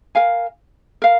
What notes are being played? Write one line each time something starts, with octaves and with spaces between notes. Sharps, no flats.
A#4 F5 G#5
A#4 F5